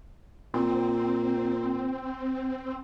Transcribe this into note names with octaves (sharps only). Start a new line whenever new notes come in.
A#2 C4